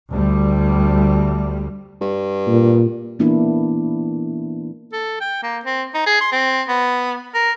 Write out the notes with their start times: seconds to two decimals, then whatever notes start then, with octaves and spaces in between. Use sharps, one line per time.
0.11 D2 G3
2.01 G2
2.48 A#2
3.19 E3 A#3 B3 D4 E4
4.93 A4
5.21 G5
5.43 A#3
5.65 C4
5.94 D#4
6.06 G#4
6.21 C6
6.32 C4
6.68 B3
7.35 A#4